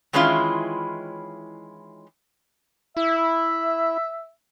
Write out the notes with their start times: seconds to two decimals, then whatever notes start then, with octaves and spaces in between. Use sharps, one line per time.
0.13 D#3 E3 G#3 C#4 E4 F4
2.97 E4 E5